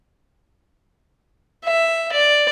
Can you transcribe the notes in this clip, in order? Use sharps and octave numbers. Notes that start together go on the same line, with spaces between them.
E5
D5